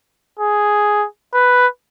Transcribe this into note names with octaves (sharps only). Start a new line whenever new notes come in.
G#4
B4